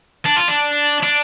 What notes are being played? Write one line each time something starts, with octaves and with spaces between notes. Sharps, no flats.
D4
F4
D4
D4